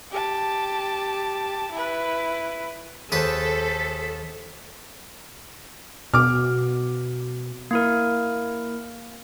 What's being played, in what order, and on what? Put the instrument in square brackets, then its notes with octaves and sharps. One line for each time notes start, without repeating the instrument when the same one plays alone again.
[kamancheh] G4 A5
E4 B4
[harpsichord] D#2 B4 D#6 [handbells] G#4 C5 [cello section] A4 [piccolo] B6
[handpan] B2 [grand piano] D6 F6
[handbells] A#3 E4 A#4